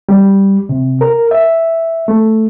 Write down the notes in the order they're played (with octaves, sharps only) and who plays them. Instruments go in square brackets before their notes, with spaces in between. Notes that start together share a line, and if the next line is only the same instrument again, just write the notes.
[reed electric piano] G3
C3
A#4
E5
A3